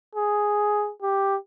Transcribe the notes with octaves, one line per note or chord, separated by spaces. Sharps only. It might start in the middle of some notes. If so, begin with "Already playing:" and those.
G#4
G4